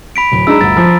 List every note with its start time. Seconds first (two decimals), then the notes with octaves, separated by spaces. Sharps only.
0.16 B5 B6 D7
0.32 D1
0.47 G#3 D4 D#4 A#5 E6
0.61 G1 D2 A6
0.77 F3